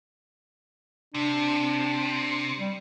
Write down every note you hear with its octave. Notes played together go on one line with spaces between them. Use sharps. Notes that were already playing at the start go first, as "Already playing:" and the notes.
C3 D4
G3